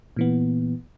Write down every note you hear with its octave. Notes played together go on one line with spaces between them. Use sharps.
A#2 E3 B3